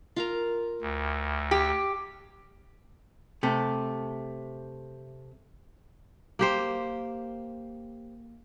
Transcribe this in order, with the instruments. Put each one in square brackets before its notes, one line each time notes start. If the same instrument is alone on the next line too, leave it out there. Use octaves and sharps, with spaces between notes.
[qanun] F4 A#4 A#5
[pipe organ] D2
[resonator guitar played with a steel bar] G4
[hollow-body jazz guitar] C3 A3
[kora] A#3 G4 C5